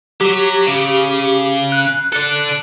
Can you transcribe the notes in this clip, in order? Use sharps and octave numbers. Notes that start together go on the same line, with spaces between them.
F#3 G4
C#3
F#6
A4 D5